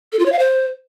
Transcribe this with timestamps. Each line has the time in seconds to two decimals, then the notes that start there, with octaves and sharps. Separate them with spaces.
0.13 A4
0.19 F4
0.26 C#5
0.32 F5
0.39 C5